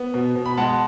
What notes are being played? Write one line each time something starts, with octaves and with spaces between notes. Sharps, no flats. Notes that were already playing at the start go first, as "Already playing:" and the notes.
Already playing: B3
B2
B2
B5
G#3 F#5 A5